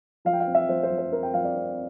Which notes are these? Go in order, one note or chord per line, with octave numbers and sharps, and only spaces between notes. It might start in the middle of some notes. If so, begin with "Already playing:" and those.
F3 F5
G5
F5
C4
E5
F3 C5
C5
F3
C5
C4 A#4
G5
F3 F5
D5
C4